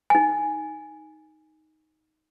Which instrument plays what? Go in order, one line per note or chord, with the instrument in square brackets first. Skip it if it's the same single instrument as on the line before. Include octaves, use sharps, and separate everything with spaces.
[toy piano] D#4 G#5